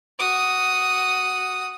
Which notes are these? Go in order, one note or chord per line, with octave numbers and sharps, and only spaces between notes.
F#4 D#6